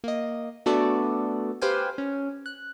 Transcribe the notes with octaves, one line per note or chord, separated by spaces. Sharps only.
A#3 D#5
A3 B3 D4 F#4 A4 D5
G4 B4 C5 F5 G5 G#5
C#4
F#6